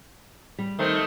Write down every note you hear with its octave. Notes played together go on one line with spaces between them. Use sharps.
G3
D#3 A3 C4